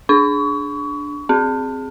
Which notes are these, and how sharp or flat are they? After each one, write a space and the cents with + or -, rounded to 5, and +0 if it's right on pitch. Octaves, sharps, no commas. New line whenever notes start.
D4 +0 C#6 +30
C4 +0 G#4 +0